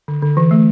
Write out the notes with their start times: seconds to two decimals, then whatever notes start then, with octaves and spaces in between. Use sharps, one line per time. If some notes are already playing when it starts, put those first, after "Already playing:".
0.08 D3
0.22 D3
0.37 E3
0.51 A3